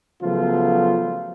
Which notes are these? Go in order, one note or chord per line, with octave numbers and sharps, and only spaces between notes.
C#3 F3 F#3 A3 B3 F4